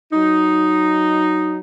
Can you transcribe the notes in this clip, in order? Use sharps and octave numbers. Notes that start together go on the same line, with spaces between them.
F#3 D#4